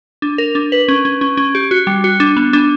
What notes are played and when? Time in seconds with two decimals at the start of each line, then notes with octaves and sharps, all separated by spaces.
0.22 D4
0.38 A#4
0.55 D4
0.72 B4
0.88 C#4
1.05 C#4
1.21 C#4
1.37 C#4
1.55 G4
1.71 F#4
1.87 G3
2.04 F#4
2.20 D4
2.37 B3
2.53 D4